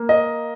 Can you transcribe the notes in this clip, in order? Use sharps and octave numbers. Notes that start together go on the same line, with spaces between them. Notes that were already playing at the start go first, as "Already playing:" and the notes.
Already playing: A#3
D#5